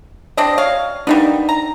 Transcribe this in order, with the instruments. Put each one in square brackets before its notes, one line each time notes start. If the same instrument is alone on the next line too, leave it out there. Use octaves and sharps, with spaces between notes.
[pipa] C4 D4 D#5 [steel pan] D5
[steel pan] C#5 [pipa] F5
[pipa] G3 A#3 B3 [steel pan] D4 D#4
[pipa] A#5